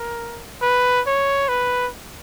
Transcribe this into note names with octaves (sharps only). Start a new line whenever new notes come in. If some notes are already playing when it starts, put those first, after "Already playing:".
Already playing: A#4
B4
C#5
B4